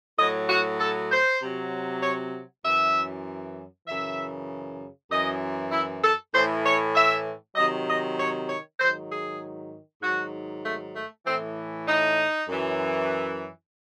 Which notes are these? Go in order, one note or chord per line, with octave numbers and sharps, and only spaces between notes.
A2 F#3 D#5
F#4
A4
C5
C3 F#3
C#5
F#2 E3 E5
F#2 C#3 E3 E5
F#2 E3 D#5
E4
A4
A2 E3 C5
C#5
E5
C3 D#3 F#3 D#5
D#5
C#5
C#5
G#2 D#3 F#3 C5
G#4
G#2 D#3 F#3 F#4
A3
A3
A2 E3 C4
D#4
F#2 E3